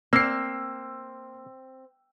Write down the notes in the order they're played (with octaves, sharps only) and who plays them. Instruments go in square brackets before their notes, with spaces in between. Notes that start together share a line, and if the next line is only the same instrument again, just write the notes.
[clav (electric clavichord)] A#3 [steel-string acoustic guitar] C4 [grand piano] E6 C7